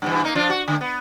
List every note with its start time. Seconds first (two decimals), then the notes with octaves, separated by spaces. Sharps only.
0.02 G2 B2 E3
0.24 A#3 D#4
0.35 F3 D4 F4
0.50 F#4
0.68 D3 A3
0.81 B3